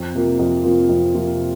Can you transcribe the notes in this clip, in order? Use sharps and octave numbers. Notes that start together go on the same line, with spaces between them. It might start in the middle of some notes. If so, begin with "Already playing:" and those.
Already playing: F2
C3 F3 A#3 F4
F2
C3 F3 A#3 F4
F2
C3 F3 A#3 F4